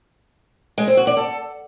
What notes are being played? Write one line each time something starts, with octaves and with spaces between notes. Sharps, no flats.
G#3
C4
F#4
D5
A4